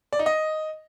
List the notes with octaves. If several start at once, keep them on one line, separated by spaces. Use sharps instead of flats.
D5
D#4
D#5